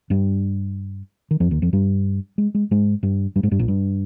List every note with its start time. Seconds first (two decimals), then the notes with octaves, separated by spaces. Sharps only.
0.10 G2 G3
1.31 D#3
1.40 F2 F3
1.51 D#2 D#3
1.62 F2 F3
1.73 G2 G3
2.38 G#3
2.55 G#3
2.71 G#2 G#3
3.03 G2 G3
3.36 G2 G3
3.43 G#2 G#3
3.52 G2 G3
3.59 A#1 A#2
3.68 G2